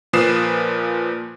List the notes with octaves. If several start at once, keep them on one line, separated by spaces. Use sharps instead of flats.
A#2 F3 B4 D#6 C7 E7